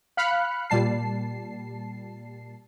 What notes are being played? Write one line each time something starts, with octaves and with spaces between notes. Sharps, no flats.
F5 B5 F6 F#6 C#7
A#2 G3 A5 C7